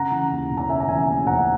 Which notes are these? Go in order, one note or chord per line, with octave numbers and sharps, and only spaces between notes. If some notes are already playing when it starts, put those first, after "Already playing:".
Already playing: C#3 F#5 A#5
E3
D#2
E1
A#5
C#3 E5 G#5
A#5
E3 E5 G#5
D#2
E1 F#5 A#5